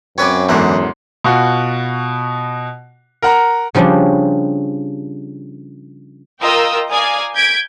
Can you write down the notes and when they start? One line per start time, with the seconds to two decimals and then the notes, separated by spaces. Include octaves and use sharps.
0.18 F#2 C4 B4 C#5 G#5 D6
0.49 E2 G#2 D3 E3 F#5 C6
1.24 B2 F4 F#4
3.22 A#4 F#5 A#5
3.75 C#3 F3 G3 C#4 D4
6.40 F4 A#4 D#5 G5 D#6 E6
6.90 D5 F5 G#5 A#5 D#6
7.34 G6 G#6 B6 D7